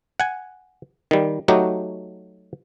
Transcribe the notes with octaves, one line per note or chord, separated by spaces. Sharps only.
F#5 G#5
D#3 G3
F#3 A3 D#4 F#4 G4